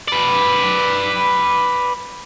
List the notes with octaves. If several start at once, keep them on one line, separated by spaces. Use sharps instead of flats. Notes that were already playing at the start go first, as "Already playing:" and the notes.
B4 D5